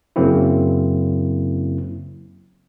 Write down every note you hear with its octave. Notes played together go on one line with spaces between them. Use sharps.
F#2 C#3 F#3 A#3 C4 E4